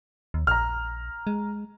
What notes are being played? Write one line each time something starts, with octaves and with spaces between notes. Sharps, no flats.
D#2
A#1 A#5 F6
G#3